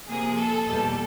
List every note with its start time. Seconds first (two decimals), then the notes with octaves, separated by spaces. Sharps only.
0.08 C3 F3 A#3 G#4
0.37 A4
0.66 E2 B2 G3 A#3 A4